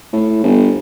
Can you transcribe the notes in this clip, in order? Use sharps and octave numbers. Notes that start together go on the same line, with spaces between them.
A2
G1